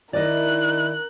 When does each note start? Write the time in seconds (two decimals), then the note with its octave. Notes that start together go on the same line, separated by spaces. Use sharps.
0.13 D#3 E4 A#4 D5 D#5 F#6